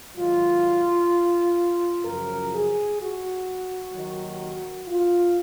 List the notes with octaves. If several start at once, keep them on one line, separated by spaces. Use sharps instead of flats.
G#2 D#3 F#3 F4
F#2 C#3 F3 A#4
G#4
F#4
D#2 D#3 F#3
F4